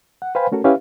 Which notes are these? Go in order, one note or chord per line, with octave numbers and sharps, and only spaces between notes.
F#5
B4 C5 F5 G5 G#5 B5
A3 C#4 F#4 A4 A#4
C#4 E4 G4 B4 E5 F5